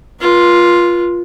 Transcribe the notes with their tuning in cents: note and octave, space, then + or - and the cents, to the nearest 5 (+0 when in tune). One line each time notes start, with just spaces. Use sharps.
F4 +0 B4 -40